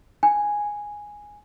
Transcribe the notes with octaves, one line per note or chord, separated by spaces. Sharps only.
G#5